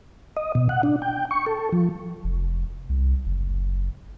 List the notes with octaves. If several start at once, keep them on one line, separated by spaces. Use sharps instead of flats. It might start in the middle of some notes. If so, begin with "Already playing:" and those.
D#5
B2
F#5
D4
G5
C#6
A4
F3
F1
C2
F#1